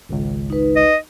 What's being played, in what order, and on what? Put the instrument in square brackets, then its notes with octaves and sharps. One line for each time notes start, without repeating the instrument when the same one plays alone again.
[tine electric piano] G#1 C#2
[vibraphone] D#4 B4
[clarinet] D#5